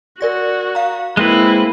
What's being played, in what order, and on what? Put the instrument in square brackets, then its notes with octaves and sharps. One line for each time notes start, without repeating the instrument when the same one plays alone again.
[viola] F#4 [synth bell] A#4 D5 A#6
[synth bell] F5 A#5
[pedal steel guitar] G#3 C4 B4 [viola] A#3 E4